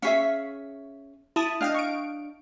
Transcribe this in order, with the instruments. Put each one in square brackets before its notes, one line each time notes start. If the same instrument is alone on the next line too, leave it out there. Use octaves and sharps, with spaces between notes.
[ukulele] C#4 G#4 E5 [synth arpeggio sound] F5 C#6 B6
[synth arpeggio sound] E4 A5 D#6
[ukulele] D4 F5 [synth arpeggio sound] D#5 G5 F6
[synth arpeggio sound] C#6 D7